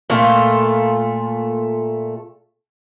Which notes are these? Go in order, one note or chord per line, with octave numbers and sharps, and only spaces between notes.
A#2 A3 F4